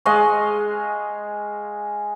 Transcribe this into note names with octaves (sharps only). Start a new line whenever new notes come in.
G#3 D#5 F5 C#6